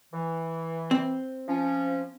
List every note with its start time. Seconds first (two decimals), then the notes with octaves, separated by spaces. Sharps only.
0.14 E3
0.91 C4
1.48 F3 C#4